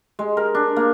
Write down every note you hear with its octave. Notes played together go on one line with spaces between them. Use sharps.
G#3
A#4
D4
A#3